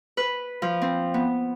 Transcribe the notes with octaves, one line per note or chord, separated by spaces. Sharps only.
B4
F3
C4
B3